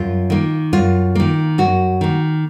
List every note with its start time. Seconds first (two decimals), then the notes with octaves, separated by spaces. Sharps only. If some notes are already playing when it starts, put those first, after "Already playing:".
Already playing: F#2 F4
0.30 D#3 A#3
0.73 F#2 F4
1.15 D#3 A#3
1.58 F#2 F#4
2.01 D#3 A#3